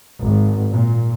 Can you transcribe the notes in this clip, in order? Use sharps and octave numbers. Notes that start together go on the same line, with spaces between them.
G#1
A#2